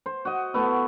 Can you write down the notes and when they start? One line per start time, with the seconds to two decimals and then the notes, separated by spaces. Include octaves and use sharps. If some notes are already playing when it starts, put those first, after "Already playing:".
0.06 C5
0.25 F#4 D#5
0.54 A3 B3 E4